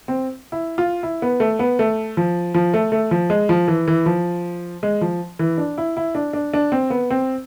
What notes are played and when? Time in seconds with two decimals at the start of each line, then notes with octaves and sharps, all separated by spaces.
0.08 C4
0.52 E4
0.78 F4
1.03 E4
1.22 B3
1.40 A3
1.59 B3
1.79 A3
2.17 F3
2.54 F3
2.74 A3
2.92 A3
3.11 F3
3.30 G#3
3.49 F3
3.68 E3
3.87 E3
4.06 F3
4.83 G#3
5.01 F3
5.39 E3
5.58 D4
5.78 E4
5.97 E4
6.15 D4
6.33 D4
6.54 D4
6.72 C4
6.90 B3
7.10 C4